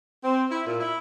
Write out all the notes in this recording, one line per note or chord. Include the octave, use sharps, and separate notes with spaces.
C4
E4
A#2
E4